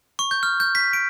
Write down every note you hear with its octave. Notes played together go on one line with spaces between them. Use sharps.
C#6
G6
F6
G6
B6
D7